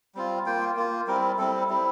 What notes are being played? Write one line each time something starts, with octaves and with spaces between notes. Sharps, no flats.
G3 C4 F4
A#3 F4 G5
A#3 F4
G3 C4 E4 A#4
G3 C4 E4 A4
G3 C4 E4